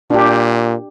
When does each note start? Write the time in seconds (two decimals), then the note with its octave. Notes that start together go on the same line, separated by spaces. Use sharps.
0.10 A#2 D4 G4